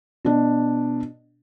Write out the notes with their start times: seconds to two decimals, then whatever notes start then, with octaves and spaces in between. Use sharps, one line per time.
0.25 B2 D4